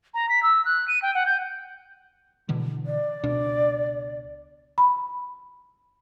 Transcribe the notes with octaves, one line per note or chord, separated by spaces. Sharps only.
A#5
B6
E6
F#6
D#7
G5
F#5
G6
B2 D3 E3
D5
C#2 B2 D4
B5